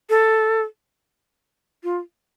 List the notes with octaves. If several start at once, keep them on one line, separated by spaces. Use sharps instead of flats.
A4
F4